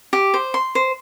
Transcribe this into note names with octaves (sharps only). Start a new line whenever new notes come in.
G4
C5
C6
C5